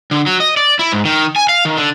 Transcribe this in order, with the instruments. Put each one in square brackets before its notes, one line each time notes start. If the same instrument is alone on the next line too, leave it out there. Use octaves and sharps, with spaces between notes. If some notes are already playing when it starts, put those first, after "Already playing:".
[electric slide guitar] D3
F#3
D#5
D5
E4
G#2
D#3
G#5
F5
D#3
D3